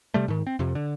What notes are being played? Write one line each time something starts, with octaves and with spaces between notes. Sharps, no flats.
C3 G3 A3
G#2 D#3
C4
F2 C3
D3